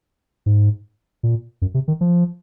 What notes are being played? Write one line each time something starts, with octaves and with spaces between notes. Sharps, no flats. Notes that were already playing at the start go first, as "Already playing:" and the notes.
G#2
A#2
F#2
C3
D#3
F3